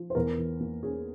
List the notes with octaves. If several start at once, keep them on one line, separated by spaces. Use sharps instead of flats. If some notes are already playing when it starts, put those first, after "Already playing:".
Already playing: F3
C5
E2 A#4
E3
A#3
C#4 G#4